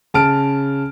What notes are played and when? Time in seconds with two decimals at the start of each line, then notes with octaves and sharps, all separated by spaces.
0.14 C#3 A5 F6 D7